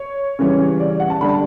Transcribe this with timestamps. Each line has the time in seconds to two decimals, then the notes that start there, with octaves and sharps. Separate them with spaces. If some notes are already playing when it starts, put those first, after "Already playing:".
Already playing: C#5
0.39 C#3 E3 G3 C#4
0.80 D5
1.00 F#5
1.10 A5
1.21 D3 G3 D4 B5
1.29 A5